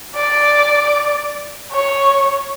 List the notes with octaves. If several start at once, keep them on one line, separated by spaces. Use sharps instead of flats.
D5
C#5